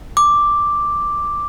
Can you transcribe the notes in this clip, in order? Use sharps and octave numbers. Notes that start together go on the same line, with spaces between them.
D6